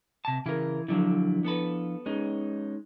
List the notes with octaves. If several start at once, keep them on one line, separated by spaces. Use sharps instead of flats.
C3 A5
C#3 E3 E4 A#4
D3 F3 F#3 D4 E4
B3 A4 B4
G#3 C#4 D#4